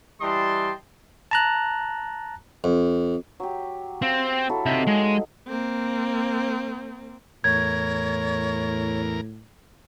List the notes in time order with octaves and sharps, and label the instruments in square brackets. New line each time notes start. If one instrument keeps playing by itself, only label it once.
[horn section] E3 G3 D#5 G5 A5 C6
[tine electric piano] A5 A#5 F#6
[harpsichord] F2
[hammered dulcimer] F#3 G4
[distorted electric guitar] C4 [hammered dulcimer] F5
[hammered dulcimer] F#3 E4 A4
[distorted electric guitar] C3 E5 [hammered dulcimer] D#4
[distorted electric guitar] G#3
[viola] A#3 C4
[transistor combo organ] E2 A#4 [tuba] A2 [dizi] C#5 [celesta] G#6